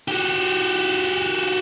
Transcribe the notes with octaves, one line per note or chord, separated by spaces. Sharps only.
F#4 G4